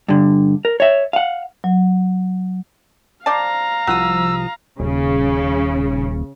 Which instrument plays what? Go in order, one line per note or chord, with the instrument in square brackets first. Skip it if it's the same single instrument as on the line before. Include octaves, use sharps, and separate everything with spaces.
[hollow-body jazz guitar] G2 D3
A#4
C#5 E5
F5 F#5
[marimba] F#3
[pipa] C5 D5 A5 [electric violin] F5 A#5
[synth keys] C2 F3 D#6 [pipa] F#4 [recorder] E6
[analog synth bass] D#1 [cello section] C#3